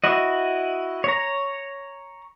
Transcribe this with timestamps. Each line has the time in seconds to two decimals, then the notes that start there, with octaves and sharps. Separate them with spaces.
0.04 E4 F#4 D#5
1.04 C#5 A#5